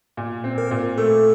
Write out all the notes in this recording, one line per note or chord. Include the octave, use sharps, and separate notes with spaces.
A#2
C4
A#4
A#2
A3 A4